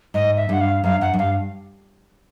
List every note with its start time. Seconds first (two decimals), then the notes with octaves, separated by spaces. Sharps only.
0.14 G#2 D#5
0.37 E5
0.49 G2 F#5
0.61 F5
0.84 F#2 F5
1.01 F#2 F#5
1.14 F#2
1.18 G2 F5